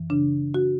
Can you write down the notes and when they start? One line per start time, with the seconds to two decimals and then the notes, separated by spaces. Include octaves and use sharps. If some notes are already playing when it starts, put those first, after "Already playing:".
Already playing: F#2 E3
0.10 C#3 D4
0.54 F#4